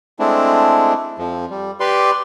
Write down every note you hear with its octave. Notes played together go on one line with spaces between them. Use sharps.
G#3 A3 C4 D4 E4
F2 F3
G3
G4 B4 D5 C6